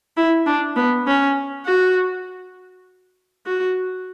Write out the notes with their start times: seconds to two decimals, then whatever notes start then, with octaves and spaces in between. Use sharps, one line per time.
0.17 E4
0.46 D4
0.76 B3
1.07 C#4
1.66 F#4
3.46 F#4